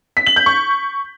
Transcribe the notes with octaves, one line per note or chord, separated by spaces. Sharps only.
B6
F#7
G6
C#6